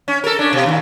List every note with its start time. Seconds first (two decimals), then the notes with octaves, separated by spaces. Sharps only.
0.08 C#4
0.24 A4 A#4
0.39 C#4 D4
0.53 B2
0.66 D#2 A#2